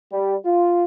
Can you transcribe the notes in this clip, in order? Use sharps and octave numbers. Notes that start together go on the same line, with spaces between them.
G3
F4